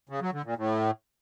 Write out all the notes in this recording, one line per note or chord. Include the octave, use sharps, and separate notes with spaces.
C#3
F#3
D3
A#2
A2